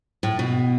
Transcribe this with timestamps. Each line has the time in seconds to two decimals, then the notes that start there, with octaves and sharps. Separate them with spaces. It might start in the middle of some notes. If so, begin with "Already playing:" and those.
0.23 A2
0.39 B2